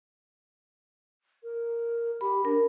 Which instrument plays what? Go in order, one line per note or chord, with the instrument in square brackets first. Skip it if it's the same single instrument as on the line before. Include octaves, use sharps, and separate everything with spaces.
[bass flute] A#4
[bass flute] G4 [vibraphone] B5
[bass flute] D4 [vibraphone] A#4